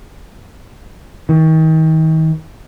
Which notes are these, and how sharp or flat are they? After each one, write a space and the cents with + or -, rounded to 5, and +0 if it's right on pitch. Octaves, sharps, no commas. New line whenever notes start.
D#3 +35